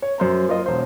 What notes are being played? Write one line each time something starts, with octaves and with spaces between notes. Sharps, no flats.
C#5
F#2 C5 A#5
A#3 F4 A#4 D#5
E1 C5